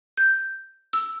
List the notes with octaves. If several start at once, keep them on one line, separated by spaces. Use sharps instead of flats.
G6
E6